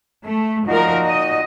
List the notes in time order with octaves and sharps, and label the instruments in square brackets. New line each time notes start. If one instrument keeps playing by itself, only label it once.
[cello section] A3
[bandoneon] A#2 D#4 F#4 [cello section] F3 A#4
[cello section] D#5